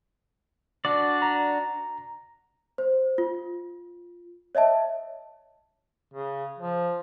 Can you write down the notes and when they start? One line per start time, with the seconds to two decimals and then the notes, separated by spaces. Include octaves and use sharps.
0.85 D4 F#4 D5
1.22 A#5
2.78 C5
3.18 F4
4.55 C#5 D#5 E5 A5
6.14 C#3
6.59 F3